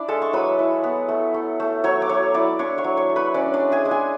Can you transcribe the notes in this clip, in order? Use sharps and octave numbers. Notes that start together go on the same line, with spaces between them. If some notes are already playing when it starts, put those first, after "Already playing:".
Already playing: D4 E4 D5
G#3 A4 A5
C#6
F#3 B4 B5
E4
B3
A3
A3
A3
F#3 C#5 C#6
D6
F#3 C#5 C#6
E4 D5 D6
D4 C#5 C#6
C#5 C#6
F#3
C#5 C#6
A3
B4 B5
C#4 D4 D5
D4 D5
G#3
G#4 G#5
G#3
G#4 G#5